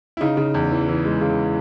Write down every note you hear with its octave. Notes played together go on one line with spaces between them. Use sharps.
E4
C#3 D#4
C#3
E2
E3
E3
G#3
C#3